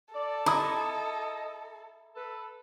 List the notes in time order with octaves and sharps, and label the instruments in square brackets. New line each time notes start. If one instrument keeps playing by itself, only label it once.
[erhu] A4 [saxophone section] D5
[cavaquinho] E4 [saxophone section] D#5 [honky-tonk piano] A#5 D6 D#6
[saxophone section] A4 B4